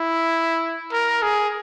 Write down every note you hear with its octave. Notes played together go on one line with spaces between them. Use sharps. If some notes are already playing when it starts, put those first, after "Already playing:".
Already playing: E4
A#4
G#4